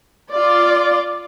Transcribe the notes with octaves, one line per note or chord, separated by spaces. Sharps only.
F4 D5